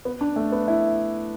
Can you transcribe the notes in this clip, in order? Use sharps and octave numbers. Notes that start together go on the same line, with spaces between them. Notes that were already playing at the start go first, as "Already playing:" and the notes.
B3
D4
A3
B3
E4